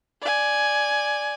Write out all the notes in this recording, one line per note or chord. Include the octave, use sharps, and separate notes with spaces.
D5 G#5